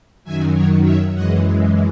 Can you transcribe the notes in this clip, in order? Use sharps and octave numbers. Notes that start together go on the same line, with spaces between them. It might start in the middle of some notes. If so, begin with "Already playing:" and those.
F#2 D#3 F#3 E5 G#5
A#4 C#5
C#5 E5
F#2 E3 G#3 D#5 F#5